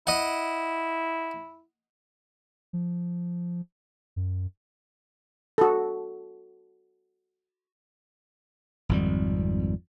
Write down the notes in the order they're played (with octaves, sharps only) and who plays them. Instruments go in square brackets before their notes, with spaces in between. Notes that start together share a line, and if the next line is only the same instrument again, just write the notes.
[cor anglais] E4 [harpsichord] D#5 F#5
[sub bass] F3
F#2
[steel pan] F#4 A4
[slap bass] G#1 F2 G3